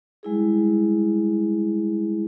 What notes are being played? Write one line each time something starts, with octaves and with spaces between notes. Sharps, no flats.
G3 G#3 E4 G#4